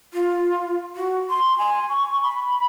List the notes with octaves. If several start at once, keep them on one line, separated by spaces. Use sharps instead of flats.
F4
F#4
C6
G#5
C#6
B5